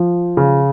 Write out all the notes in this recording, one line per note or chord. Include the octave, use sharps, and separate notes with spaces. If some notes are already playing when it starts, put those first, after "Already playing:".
Already playing: F3
C#3